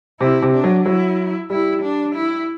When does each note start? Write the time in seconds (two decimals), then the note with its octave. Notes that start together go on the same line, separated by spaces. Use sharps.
0.20 C3 E4
0.42 C3
0.53 D4
0.64 F#3
0.86 F#3 E4
1.50 G3 E4
1.83 D4
2.15 E4